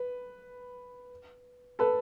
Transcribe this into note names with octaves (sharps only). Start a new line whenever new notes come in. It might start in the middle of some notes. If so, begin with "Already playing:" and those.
Already playing: B4
A4 B4